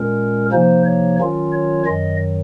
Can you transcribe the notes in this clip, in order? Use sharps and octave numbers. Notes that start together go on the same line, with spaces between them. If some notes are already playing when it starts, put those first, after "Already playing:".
Already playing: A#2 G#3 C#4 A#4
C3 F3 A#3 D#4 C5
C#5
D#3 F#3 C#4 F4
C#5
F#2 D#3 F#3 D#5